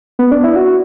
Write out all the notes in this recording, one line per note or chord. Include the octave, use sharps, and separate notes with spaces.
B3
D4
E4
F#4